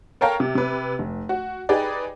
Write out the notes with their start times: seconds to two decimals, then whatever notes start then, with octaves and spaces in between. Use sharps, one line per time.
0.21 A4 A#4 C#5 F5 G5 A#5
0.40 C3
0.55 C3 B4
0.99 F1
1.29 F#4
1.69 D#4 G4 G#4 B4 D5